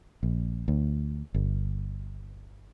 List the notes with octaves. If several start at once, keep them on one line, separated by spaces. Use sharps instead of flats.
A#1
D2
G1